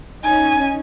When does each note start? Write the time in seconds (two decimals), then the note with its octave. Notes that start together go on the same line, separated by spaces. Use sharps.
0.24 C#4 D#4 G#5